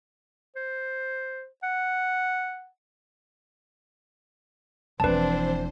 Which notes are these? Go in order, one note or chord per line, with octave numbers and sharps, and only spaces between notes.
C5
F#5
E1 E3 F3 C4 D4 B4 C5 A5